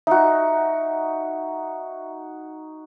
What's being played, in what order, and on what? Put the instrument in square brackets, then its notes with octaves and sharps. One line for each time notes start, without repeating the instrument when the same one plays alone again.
[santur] D#4 F#4 [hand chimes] E5